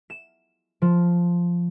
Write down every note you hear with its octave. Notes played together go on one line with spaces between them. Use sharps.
E7
F3